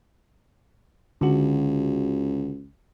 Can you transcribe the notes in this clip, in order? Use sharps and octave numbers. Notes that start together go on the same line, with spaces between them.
C#2 D3 F#4